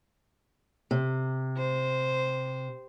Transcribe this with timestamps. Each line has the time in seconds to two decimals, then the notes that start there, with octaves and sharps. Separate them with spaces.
0.91 C3
1.57 C5